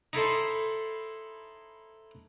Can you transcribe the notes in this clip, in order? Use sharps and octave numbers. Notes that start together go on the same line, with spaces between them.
D#4 E4 A4 C5